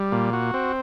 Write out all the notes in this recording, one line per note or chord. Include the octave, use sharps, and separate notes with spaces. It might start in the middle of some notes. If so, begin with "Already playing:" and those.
Already playing: G3
A#2
F#4
C4